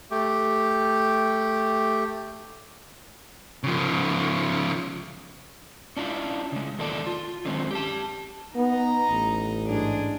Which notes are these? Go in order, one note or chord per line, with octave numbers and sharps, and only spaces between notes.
A3 G4
C#3 F3
C#4 D4 E4 F4
C#3 G#3
E2 A#2 D#3 A4 D5 A5
F4
D3 D#3 F#3 G#3 C4 C#4
G4 A5
B3 D#4 A#5
A1
G#2 D4 G#4